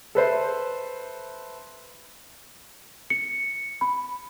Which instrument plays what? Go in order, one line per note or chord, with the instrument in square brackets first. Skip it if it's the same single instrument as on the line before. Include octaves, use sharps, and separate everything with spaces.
[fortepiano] A4 B4 C5 E5
[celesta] C#7
B5